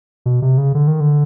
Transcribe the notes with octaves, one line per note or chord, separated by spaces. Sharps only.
B2
C3
C#3
D3
D#3
D3